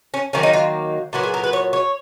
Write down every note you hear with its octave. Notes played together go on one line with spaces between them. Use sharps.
C#4
D#3 F#3 A#3 C#4
D#4
F4
A#2 F#3 B3 F#4
G#4
A#4
B4
C#5
C#5